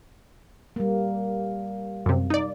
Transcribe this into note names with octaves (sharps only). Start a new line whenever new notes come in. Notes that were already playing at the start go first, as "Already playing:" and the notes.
G3 A#3
F#2 C3
D#4 D5